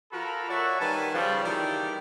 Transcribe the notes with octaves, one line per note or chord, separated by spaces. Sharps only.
F3 F4 F#4 A4 A#4 B5
F#4 A#4 C#5 D5 E5 F#5
D#3 G3 B4 G#5 A5
C#3 F3 G3
D#3 E3 G3 D4 E4 G4